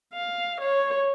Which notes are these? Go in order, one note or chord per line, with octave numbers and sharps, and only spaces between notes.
F5
C#5